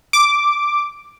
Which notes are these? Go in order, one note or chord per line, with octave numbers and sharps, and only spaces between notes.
D6